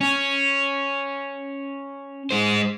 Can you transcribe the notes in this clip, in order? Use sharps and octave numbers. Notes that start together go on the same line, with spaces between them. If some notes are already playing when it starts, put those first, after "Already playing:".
C#4
G#3 C5